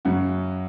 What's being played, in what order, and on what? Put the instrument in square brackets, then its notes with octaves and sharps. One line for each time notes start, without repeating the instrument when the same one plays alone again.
[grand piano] F#2 C#3 F#3 F#4